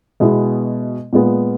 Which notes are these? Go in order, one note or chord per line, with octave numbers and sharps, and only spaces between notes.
B2 G#3 B3 E4 G#4
A#2 G#3 B3